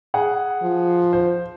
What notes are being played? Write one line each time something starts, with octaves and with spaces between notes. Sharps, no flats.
G#4 F#5
F3
C5